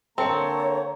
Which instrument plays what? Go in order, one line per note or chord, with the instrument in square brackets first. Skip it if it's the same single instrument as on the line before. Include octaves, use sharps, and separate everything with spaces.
[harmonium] D3 A#3 A#5 [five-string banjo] C4 [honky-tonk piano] A4 C#7 [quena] C#5